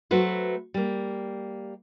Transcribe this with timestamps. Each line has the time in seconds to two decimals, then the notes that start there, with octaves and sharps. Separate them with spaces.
0.11 F#3 A3 F#4 B4 C5
0.74 G3 A#3